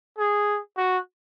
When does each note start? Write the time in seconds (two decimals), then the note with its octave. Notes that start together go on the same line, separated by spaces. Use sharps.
0.18 G#4
0.77 F#4